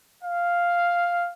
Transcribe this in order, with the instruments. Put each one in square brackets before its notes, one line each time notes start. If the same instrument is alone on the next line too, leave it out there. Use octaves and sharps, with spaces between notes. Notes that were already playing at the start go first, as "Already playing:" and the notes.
[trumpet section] F5